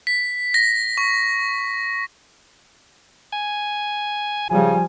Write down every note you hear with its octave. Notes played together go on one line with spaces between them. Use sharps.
B6
A#6
C#6
G#5
C#3 F3 G3 G#5